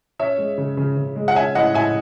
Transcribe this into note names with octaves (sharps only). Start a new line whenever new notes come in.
C#4 C#5 E5
G#3
C#3
C#3
C#3
G#3
F#5
C#4 E5 G#5
A2 D#5 F#5
A2 E5 G#5